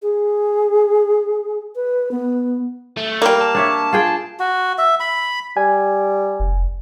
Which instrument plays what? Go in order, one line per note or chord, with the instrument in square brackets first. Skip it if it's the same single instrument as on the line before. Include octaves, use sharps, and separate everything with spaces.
[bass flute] G#4
B4
B3
[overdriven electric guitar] A3
[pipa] G3 A#3
[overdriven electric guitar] A5
[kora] D4 C#5 E5
F4 G#4 G5
[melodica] F#4
E5
B5
[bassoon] G3 [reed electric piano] G#5
[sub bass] F1